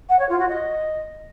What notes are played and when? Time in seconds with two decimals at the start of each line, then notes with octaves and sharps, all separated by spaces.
0.09 F#5
0.19 C#5
0.29 F4
0.39 F#4
0.49 D#5